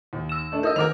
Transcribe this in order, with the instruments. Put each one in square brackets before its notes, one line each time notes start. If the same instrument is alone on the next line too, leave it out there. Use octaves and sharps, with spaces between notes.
[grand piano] D#2
[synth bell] E6 E7
[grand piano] A3 D4
[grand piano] D#4 D#5 [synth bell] A#4 D#6 E6
[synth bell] D#3 D6 [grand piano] A#4 F6 F7